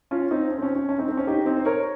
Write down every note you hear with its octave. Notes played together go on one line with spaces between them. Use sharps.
C#4 F4
C4 D#4
C#4
C4
C#4
C#4
C#4
C4 D#4
C4
C#4
D#4 G4
C4 D#4
C5
A#4 C#5